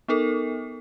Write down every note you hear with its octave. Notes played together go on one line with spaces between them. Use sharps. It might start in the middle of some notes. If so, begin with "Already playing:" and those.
B3 D#4 A4 A#4